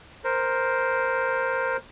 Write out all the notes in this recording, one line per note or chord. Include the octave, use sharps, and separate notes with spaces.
A#4 C5